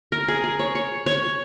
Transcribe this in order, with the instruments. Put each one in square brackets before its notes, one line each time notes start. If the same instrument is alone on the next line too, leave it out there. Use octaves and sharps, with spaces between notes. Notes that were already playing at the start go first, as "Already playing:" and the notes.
[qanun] A#4
G#4
G#4
C#5
C#5
C#5